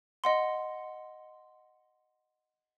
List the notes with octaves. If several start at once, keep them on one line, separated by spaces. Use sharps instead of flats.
D#5 F#5 C6